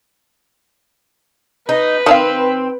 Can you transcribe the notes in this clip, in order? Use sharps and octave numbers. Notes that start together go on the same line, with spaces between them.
D#4 B4
D#3 C4 D4 F5